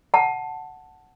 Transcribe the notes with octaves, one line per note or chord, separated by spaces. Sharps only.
F#5 A5